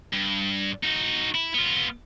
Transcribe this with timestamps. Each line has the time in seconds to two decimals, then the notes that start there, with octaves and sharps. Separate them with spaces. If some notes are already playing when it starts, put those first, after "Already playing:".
0.13 G2
0.84 D#4 F#4
1.35 E4
1.54 B3 F4